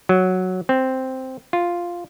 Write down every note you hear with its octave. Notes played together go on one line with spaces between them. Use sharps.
F#3
C4
F4